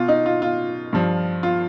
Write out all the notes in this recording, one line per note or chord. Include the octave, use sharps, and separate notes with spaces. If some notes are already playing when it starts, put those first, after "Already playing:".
Already playing: B2 F4
D#4
F4
F4
G2 F3
F4